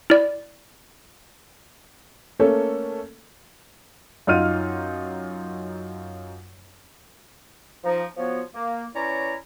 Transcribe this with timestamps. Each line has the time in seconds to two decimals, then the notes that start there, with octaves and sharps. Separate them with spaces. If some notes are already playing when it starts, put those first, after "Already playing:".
0.10 E4 D5
2.39 A3 A#3 C#4 A4
4.27 F#2 D#4 F4 F6 D#7
7.84 F3 D#4
8.17 F3 B3 F#4 C#5
8.54 A#3
8.95 E3 C#4 E4 C#5 D5 A#5